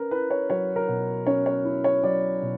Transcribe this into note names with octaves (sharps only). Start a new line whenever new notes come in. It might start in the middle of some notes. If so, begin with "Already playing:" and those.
Already playing: C#4 A#4 B4
E4 B4
C#5
F#3 C#5
A#4
B2
C#4 C#5
C#5
E4
C#5
F#3 D5
B2